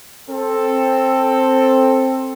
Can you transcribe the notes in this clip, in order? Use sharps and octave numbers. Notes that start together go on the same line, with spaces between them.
C4 A4